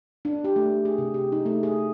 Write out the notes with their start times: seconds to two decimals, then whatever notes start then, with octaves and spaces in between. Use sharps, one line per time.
0.25 D4
0.44 G4
0.56 A3
0.85 G#4
0.98 C3
1.14 G4
1.32 D#4
1.46 A3
1.63 G#4